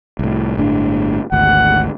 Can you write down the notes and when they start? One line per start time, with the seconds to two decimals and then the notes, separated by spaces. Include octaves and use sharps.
0.19 C2 A2
0.57 G1 A2 D4
1.32 G#1 D2 F#5